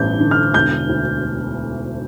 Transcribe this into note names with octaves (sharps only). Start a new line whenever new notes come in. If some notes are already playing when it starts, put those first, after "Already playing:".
Already playing: A1 G2 G6
D3
F6
E1 G6
D2